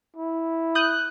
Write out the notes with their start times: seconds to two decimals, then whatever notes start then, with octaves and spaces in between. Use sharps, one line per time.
0.16 E4
0.75 D#6 F#6 G6